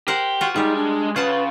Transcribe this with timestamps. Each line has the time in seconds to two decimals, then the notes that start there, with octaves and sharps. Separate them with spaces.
0.08 G4 A#4 C5 F#5
0.41 F4 F#4
0.56 G3 G#3 D#4 G4 G#4
0.77 D4
1.16 C#3 F4 B4 F#5 A5